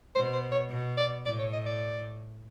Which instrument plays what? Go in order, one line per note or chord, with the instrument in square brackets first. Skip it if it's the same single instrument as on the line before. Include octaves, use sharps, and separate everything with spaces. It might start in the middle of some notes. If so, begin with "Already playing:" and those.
[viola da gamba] B2 [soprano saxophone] C5
[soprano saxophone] C5
C#5
[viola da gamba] B2
[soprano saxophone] D5
[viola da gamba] A2 [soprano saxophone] D5
[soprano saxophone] C#5
D#5
D5